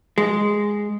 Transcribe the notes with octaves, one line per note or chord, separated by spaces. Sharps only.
G#3